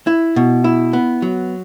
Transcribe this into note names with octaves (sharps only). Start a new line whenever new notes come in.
E4
B2
E4
B3
F#3